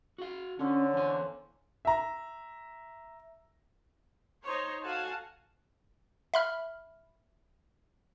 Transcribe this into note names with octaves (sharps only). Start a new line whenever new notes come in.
F#4 F5
D3 C#4 C5 C#5
E2 A#3 C#4 C5 G#5
E5 A#5
D#4 C5 C#5
F#4 A4 F5 F#5 G#5 A5
E5 B5 F6